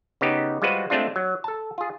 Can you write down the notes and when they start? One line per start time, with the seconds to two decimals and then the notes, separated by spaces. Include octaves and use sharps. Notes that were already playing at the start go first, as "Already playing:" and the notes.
0.21 C#3 B3 D#4 G4
0.62 G3 G#3 F4 F#4 B4 C5
0.90 G#3 A3 C4 D4 F4
1.16 F#3
1.44 A4 A5
1.78 F4 G#4